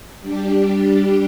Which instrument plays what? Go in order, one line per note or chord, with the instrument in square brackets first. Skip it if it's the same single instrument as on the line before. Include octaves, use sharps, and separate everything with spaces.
[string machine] G3 D4 G4